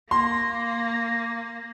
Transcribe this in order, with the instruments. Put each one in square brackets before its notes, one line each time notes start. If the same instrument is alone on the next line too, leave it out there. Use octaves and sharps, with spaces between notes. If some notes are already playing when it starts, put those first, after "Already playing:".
[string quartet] A#3 [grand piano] C6